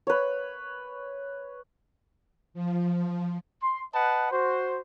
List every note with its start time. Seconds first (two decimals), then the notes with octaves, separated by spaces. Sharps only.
0.07 B4 C#5
2.54 F3
3.62 C6
3.94 B4 D#5 F#5 A5
4.31 F#4 C5